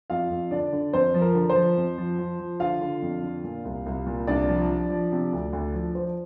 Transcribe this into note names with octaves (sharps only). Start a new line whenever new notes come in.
F2 F4 F5
F2
D3 D4 D5
D3
F2 C5
F3
A#4
D3
C5
F3
F2
F3
F3
F3
D3 F4 F5
D3
F2
D3
A#2
C2
C2
A#2
C2 D4 D5
F3
F3
F3
C3
D2
D2
F3
F3 C5